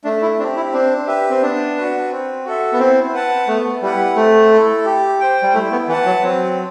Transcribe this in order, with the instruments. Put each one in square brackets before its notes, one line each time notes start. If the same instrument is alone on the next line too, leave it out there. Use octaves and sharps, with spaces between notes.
[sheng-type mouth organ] A3 [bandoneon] D4
[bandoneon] E4
[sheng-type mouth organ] C4 [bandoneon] D4
[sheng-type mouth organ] G4
[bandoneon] E4
[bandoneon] C4 [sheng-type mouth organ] D4
[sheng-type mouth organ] G4 B4 E5
[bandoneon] C4
[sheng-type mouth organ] B3 [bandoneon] D4
[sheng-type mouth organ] F#4 B4
C4
F#4 A4 E5
[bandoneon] B3
[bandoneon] C4 [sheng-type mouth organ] E4
[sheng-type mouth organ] B4 F#5 A5
[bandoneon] A3 [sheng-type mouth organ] B3
[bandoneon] G3 [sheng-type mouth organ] E4 G4 B4 F#5
[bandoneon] A3 [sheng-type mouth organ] C4
[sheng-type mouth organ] E4 A4
G4
C5 G5
[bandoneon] G3
[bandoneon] A3 [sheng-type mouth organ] E4
[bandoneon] B3
[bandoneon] E3 [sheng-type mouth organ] B4 F#5 A5
[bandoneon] F#3
[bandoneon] F#3 [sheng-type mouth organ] C4